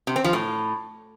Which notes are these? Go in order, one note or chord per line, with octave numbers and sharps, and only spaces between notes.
C3
C4
F3
A2